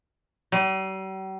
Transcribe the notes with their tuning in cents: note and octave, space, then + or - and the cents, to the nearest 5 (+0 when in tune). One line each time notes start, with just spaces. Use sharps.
G3 -45